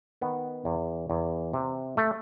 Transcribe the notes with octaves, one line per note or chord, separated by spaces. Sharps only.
D#3 B3
E2
E2
C3
A3